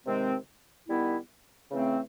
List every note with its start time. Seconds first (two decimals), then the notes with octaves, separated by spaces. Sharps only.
0.06 C3 D#3 G#3 C4
0.88 D#3 G3 B3 E4
1.71 C#3 E3 A3 C4